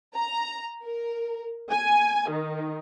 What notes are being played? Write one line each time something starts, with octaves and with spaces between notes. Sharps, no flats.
A#5
A#4
G#5
D#3